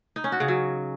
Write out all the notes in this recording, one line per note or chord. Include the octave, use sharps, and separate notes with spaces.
D#4
C#4
F#4
C#3
F#3